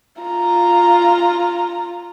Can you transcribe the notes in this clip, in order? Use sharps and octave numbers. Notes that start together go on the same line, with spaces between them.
F4 A#5